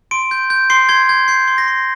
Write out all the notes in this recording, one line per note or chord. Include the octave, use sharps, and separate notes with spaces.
C6 D7
G6
G6
C6 C7
C6 G#6
G6 G#6
G6 C7
C6
A#6
C6